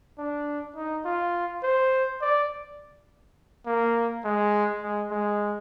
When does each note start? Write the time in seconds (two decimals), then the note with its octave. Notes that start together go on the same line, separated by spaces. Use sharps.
0.18 D4
0.76 D#4
1.05 F4
1.63 C5
2.21 D5
3.66 A#3
4.24 G#3
4.82 G#3
5.11 G#3